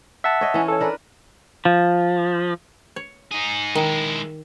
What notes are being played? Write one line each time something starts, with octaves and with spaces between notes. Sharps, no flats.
E5 F#5 A5
C#5 D#5
E3 C#4
A4 C#5
D4 A#4 B4
F3
C#5
D#4 G#4
D#3 G#3 E4